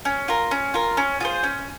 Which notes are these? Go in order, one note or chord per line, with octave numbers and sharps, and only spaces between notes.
C#4
F4 A#4
C#4
F4 A#4
C#4
F4 G#4 C5
C#4